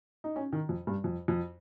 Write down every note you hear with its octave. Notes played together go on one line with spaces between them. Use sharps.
D#4
C#4
D#3
F2
G2
F2
F2